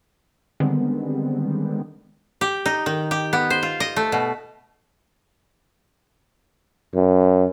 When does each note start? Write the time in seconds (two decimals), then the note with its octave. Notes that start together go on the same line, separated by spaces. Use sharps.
0.60 D3 D#3 G3 G#3 B3 C4
2.41 G4
2.66 D#4
2.86 D#3
3.11 G4
3.33 B3
3.50 C5
3.63 F4
3.80 D#5
3.96 A3
4.12 B2
6.95 F#2